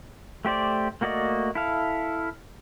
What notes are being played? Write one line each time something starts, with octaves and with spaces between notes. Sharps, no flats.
A3 G4 C5 D5
A3 A#3 F#4 D5 D#5
E4 A4 F5